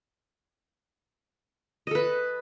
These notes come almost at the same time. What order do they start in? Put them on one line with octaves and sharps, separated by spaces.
D#5 A4 B4